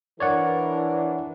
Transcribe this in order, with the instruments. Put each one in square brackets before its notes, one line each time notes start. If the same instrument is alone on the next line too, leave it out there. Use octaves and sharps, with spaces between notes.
[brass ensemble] E3 D4 [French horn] A#4 [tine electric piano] C#5 D5 F#5